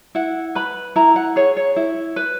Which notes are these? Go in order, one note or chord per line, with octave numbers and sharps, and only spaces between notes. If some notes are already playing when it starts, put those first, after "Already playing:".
E4 F#5
B4 B5
E4 A#5
F#5
G#4 C#5
C#5
E4
B4